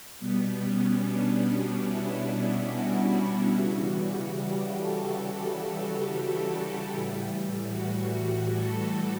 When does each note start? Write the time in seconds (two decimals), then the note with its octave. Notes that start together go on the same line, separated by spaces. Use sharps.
0.19 B2 G3 B3
0.61 C#4
1.03 D4
1.44 C#4
1.86 E4
2.70 F#4
3.53 C#3 E3 G3
4.37 G4
4.78 A4
5.20 G4
6.87 A2 E3 G3
7.70 F#4
8.54 A4